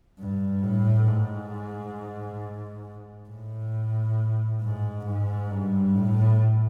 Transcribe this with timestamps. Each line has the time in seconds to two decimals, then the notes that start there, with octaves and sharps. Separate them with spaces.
0.19 G2
0.63 A2
1.08 G#2
3.29 A2
4.62 G#2
5.06 G#2
5.50 G2
5.95 A2